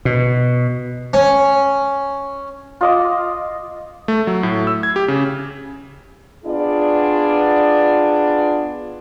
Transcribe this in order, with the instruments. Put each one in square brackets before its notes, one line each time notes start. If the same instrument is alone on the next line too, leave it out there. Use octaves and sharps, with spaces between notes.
[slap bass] B2
[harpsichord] C#4
[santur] F4 D#5 D6
[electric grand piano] A3
F#3
A2
E6
G#6
G4
C#3
[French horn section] B3 D4 F4 G#4 D5